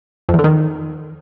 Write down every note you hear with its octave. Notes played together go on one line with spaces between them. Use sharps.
F2
E2
D3
D#3